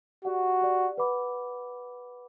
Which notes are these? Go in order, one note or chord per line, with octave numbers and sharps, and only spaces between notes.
F#4 G4 D5 F#5
G4 D5 F#5
B4 F#5 B5 D6